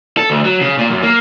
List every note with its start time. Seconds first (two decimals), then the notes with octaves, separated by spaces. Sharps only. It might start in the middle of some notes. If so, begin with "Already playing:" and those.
0.17 A4
0.30 D2
0.44 F#3
0.61 C#3
0.78 A#2
0.90 F#2
1.02 A#3